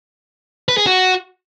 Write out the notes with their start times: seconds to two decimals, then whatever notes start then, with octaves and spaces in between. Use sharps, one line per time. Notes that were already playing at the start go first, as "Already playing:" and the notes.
0.68 B4
0.78 G#4
0.87 F#4